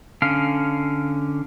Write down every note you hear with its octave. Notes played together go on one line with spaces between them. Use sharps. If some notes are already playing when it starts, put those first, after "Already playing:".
D3 C#4 F5